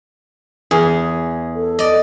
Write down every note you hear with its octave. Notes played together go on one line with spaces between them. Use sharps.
E2 G#4
A4
D5 D#5